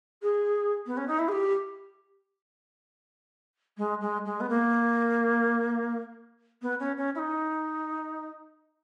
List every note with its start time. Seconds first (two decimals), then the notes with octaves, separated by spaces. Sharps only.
0.22 G#4
0.86 B3
0.97 C#4
1.07 D#4
1.18 E4
1.28 G#4
1.31 G4
3.77 G#3
4.01 G#3
4.25 G#3
4.40 B3
4.49 A#3
6.62 B3
6.79 C#4
6.97 C#4
7.15 E4
7.18 D#4